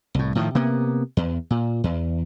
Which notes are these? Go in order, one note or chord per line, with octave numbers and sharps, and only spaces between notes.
C2 A2
A2 D#3 F3
C3 A#3 B3
E2
A#2
E2